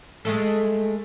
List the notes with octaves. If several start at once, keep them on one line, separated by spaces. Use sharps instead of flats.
G#3 A3 A4